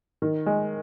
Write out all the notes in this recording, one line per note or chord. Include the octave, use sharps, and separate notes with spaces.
D#3
G#3